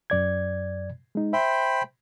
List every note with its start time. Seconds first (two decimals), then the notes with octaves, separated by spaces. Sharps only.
0.10 F#2 D5 G#6
1.15 G#3 D#4
1.33 C5 E5 G5 B5